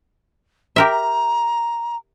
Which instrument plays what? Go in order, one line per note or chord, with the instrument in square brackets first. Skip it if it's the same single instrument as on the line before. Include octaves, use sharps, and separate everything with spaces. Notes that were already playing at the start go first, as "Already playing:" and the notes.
[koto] G4 A#4 E5 [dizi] A#5